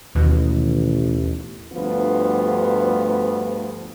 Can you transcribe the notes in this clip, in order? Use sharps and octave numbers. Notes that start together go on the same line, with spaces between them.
A1 D#2 B2
D2 G2 F3 B3 F4